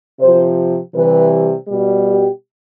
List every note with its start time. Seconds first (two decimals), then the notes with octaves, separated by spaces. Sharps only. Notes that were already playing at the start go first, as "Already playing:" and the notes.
0.20 C3 F3 C5
0.94 C3 E3 G3 B4
1.67 B2 G3
2.05 G4